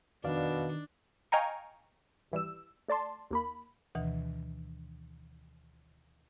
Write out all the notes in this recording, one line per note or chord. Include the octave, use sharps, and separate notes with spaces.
F2 B2 D#3 D4 D5 F5
D#5 F5 G5 G#5 A#5 C#6
G#1 E3 G3 E6
A3 D5 A5 C6
D#2 A#3 B5
D2 B2 D#3 E3